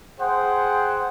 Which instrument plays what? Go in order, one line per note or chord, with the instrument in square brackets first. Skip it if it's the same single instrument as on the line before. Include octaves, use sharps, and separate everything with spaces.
[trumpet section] G#4 C5 F#5 G5